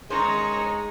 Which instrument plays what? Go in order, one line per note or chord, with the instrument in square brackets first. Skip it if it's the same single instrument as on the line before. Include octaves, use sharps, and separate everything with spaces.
[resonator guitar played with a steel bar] D#3 C#4 C5 [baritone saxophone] G#3 [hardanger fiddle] D#4 [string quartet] C#5 A#5